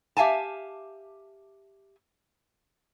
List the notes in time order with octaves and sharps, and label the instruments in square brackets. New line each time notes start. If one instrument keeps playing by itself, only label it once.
[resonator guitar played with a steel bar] G4 E5 F5 G#5 A5